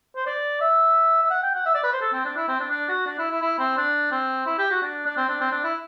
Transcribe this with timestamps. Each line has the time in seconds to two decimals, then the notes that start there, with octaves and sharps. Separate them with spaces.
0.16 C5
0.27 D5
0.61 E5
1.23 E5
1.31 F#5
1.43 G5
1.55 F#5
1.66 E5
1.75 D5
1.84 B4
1.93 C5
2.01 A4
2.13 C4
2.25 D4
2.37 E4
2.48 C4
2.60 D4
2.71 D4
2.89 F#4
3.07 D4
3.19 E4
3.31 E4
3.42 E4
3.59 C4
3.78 D4
4.12 C4
4.47 E4
4.59 G4
4.71 F#4
4.83 D4
5.06 D4
5.17 C4
5.29 D4
5.41 C4
5.52 D4
5.64 E4